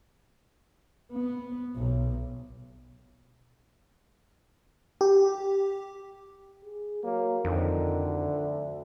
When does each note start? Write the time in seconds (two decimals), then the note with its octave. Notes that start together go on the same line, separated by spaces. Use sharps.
1.12 B3
1.76 B1
5.01 G4
6.64 G#4
7.04 F#3 A#3
7.45 F2 D3 D#3
8.02 D2